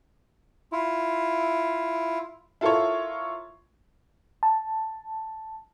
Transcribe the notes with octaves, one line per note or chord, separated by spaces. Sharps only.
E4 F4
E4 F4 A4 A#4 C#5
A5